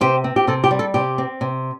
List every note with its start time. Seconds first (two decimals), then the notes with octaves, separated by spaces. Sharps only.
0.01 C3 G4 C5
0.24 C4
0.36 G4
0.47 C3 A4
0.64 G4
0.71 G3
0.79 A4
0.94 C3 G4
1.18 C4
1.41 C3